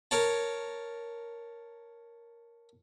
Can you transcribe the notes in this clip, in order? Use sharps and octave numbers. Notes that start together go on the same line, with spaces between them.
A#4 C#5 A5